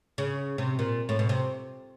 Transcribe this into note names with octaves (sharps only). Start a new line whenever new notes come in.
C#3
C3
A#2
A2
B2
C3